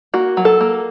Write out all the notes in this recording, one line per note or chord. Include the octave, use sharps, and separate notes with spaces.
A#3 F#4
F#3
A4
A#3